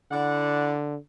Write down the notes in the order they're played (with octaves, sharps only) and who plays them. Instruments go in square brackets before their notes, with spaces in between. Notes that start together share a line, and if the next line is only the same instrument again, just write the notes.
[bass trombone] D3 [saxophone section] E4 D5 F#5